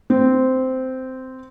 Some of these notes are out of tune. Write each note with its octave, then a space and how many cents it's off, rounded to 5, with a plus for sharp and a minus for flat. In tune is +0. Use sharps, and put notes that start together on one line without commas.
C4 -10